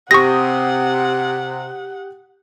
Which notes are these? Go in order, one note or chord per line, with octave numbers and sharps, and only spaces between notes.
C3 G4 F#5 C#6 D#6 A#6